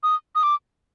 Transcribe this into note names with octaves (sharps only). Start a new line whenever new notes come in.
D#6
D#6
D6